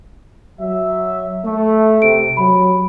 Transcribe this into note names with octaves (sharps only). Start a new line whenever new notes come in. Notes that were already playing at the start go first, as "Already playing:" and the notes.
F#3 E5
A3
C3 D7
F#3 B5